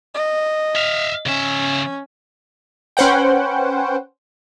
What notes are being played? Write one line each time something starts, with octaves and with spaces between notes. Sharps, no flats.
D#5
E5 F5
C#3 C#4 E5
C#4 B4 C5 F#5 G5